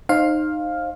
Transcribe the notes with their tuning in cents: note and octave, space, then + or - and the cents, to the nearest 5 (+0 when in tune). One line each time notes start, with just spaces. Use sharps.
D#4 -15 C5 +25 F5 +5